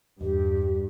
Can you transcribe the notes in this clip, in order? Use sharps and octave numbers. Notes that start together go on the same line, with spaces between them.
E2 G2 G4